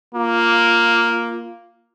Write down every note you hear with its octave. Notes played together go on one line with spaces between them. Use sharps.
A#3 F4